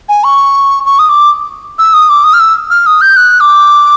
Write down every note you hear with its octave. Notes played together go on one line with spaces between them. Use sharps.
G#5
C#6
C#6
D#6
D6
E6
D#6
D6
D#6
F6
E6
F6
D#6
G6
F#6
D6